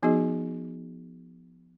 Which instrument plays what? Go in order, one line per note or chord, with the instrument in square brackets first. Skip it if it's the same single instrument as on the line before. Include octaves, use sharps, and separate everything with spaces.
[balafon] F3 B3 D#4 F#4 G#4 D#5